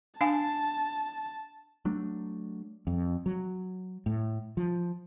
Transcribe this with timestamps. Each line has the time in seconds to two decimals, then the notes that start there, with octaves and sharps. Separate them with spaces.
0.21 D4 F5 G#5 A5
1.85 F#3 A3 D4
2.87 F2
3.26 F#3
4.06 A2
4.57 F3